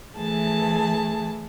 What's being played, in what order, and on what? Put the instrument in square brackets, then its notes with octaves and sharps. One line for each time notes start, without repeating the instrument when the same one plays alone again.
[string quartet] E3 A3 G#4 A5